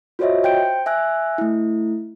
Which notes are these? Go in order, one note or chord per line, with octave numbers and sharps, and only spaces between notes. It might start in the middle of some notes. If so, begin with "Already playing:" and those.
F4 F#4 C5 C#5 D#5 E5
C5 G5 G6 D7
E5 G#5 E6 F#6
A3 E4